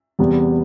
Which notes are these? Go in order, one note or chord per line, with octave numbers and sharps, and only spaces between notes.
E2 C3 G3 B3